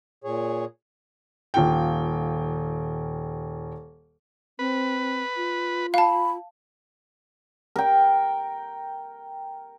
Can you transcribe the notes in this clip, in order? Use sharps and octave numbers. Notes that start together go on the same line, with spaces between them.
A#2 G#4 C#5
D#1 F4 G5
C4 B4
F4
F5 A5 B5
A#4 G5